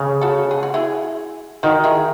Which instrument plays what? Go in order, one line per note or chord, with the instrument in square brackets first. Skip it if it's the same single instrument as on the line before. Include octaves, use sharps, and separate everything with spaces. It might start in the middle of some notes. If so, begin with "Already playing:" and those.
Already playing: [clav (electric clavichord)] C#3
[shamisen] F#4 A4
G#4
F#4
E4 G#4
[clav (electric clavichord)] D#3 [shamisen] D#4 F#4
[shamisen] E4 G#4